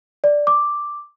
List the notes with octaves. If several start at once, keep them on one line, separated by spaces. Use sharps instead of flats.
D5
D6